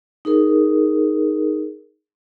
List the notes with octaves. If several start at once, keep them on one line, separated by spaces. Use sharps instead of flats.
D#4 G#4 A#4